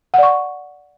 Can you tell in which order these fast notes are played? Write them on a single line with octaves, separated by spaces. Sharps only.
F#5 D5 C#6